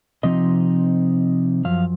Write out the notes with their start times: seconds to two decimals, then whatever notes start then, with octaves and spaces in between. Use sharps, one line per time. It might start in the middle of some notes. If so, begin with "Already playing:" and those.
0.23 C3 F3 C4 D#4 D#5
1.65 F#2 F3 F5